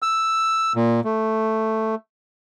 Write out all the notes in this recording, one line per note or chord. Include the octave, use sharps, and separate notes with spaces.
E6
A#2
A3